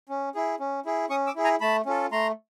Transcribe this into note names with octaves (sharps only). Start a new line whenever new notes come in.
C#4
E4 G#4
C#4
E4 G#4
C#4 C#6 D#6
D6 E6
E4 G#4
G#5 A#5
A3 A5 B5
C#4 F4 A4
A3 A#5 C6